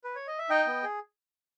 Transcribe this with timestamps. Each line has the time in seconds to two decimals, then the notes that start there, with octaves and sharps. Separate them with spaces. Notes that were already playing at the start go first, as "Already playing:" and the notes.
0.04 B4
0.15 C#5
0.27 D#5
0.38 E5
0.50 D#4 D#5 G5
0.67 B3
0.83 G#4